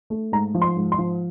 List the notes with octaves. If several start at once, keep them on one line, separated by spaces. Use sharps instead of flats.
A3
G#2 A#5
F3
C6
G#2
C6
F3